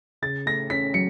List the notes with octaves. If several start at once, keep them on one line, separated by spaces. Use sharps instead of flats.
C#3 A6
A3 A#6
C#4 B6
F#3 C#7